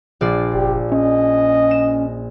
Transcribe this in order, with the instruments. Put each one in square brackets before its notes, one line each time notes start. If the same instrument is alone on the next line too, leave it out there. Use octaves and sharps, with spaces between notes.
[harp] A#1 F4 D5
[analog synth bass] F#1 [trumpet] G4
[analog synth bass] C#4 [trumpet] D#5
[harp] E7